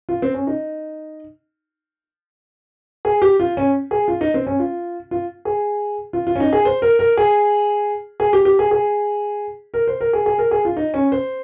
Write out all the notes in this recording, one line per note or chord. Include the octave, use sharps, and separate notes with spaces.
F4
C4
C#4
D#4
G#4
G4
F4
C#4
G#4
F4
D#4
C4
C#4
F4
F4
G#4
F4
F4
C#4
D#4
G#4
C5
A#4
A#4
G#4
G#4
G4
G4
G#4
G#4
A#4
C5
A#4
G#4
G#4
A#4
G#4
F4
D#4
C#4
C5